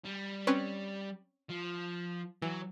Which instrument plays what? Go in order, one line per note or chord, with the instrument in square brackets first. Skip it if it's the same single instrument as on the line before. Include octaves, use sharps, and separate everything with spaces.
[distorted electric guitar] G3
[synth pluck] C4 C#4 B4
[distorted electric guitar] F3
[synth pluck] E3 [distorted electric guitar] F#3